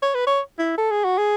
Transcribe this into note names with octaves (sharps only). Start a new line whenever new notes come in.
C#5
B4
C#5
E4
A4
G#4
F#4
G#4